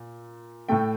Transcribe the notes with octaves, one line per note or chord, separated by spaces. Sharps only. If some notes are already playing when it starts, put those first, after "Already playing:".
Already playing: A#2
A2 A3 G5